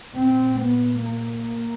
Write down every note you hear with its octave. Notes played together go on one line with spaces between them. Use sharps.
A#2 C4
B3
A#3